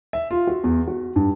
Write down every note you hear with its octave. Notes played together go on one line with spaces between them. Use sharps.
E5
F4
F#4
E2
F#4
G2